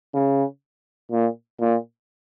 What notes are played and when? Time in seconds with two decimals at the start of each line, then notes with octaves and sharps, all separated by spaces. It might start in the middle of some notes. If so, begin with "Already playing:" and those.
0.14 C#3
1.11 A#2
1.60 A#2